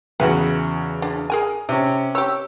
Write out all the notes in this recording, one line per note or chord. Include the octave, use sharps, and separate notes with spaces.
E2 C#3 F#4 B4
D4
G#4 A#4 G#5
C3 C#4
G4 C#5 E6